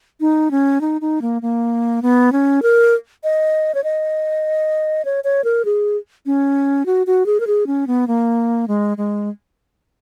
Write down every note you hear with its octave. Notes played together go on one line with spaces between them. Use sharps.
D#4
C#4
D#4
D#4
A#3
A#3
B3
C#4
A#4
D#5
C#5
D#5
C#5
C#5
A#4
G#4
C#4
F#4
F#4
G#4
A#4
G#4
C#4
B3
A#3
G#3
G#3